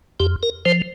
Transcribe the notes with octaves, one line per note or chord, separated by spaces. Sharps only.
F2 G4
A#4
F3 C5